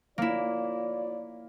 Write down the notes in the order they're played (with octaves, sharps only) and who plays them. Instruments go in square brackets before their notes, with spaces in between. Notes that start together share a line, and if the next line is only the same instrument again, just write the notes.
[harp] A#3 E4 [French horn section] F4 C#5 D5